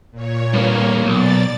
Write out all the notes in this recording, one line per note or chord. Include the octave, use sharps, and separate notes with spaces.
A#2 C#5
G2 A#3
B1 D5 A6